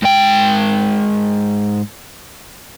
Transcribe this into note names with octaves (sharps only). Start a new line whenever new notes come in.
G#2 G5